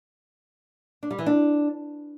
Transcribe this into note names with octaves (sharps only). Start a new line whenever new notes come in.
D4
G3
E3
D4